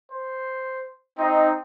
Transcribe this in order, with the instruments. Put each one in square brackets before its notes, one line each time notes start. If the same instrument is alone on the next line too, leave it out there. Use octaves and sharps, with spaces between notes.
[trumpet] C5
[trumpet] C4 [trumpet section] D#4